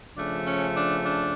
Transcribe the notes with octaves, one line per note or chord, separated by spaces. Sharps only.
C#3 F3 A3 D4
C#4
D4
D4